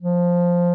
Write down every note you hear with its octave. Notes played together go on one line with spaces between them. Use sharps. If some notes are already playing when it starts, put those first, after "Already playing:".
F3